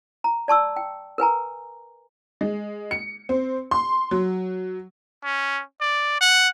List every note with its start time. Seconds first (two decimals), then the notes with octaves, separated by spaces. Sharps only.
0.24 A#5
0.48 D5 A5 C#6 E6
0.76 G5
1.18 A#4 B4 G#5 A#5
2.41 G#3
2.91 C#7
3.29 C4
3.71 C6
4.11 F#3
5.24 C#4
5.81 D5
6.21 F#5